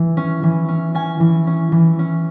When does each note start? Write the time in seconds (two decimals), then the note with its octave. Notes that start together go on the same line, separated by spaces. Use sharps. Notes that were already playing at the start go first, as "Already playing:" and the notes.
Already playing: E3
0.17 C#4
0.43 E3
0.68 C#4
0.95 C#4 G#5
1.20 E3
1.47 C#4
1.72 E3
1.99 C#4